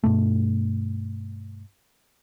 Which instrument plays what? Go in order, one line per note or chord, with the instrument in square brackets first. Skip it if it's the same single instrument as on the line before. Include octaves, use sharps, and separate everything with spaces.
[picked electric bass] G2 B2 A3